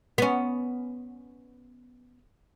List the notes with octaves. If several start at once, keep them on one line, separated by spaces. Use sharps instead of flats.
B3 C#4